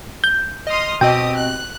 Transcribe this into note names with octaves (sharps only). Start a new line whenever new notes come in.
G6
D#5 C6 D#6 F6
B2 C4 G4 D#5 G5 D#6
F#6